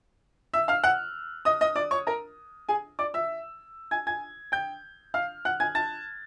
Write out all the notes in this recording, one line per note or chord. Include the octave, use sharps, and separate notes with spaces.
E5 E6
F5 F6
F#5 F#6
D#5 D#6
D#5 D#6
D5 D6
C#5 C#6
A#4 A#5
G#4 G#5
D5 D6
E5 E6
G#5 G#6
G#5 G#6
G5 G6
F5 F6
F#5 F#6
G#5 G#6
A5 A6